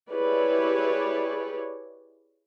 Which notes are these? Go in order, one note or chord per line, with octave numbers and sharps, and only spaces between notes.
E4 G4 G#4 B4 C#5 D5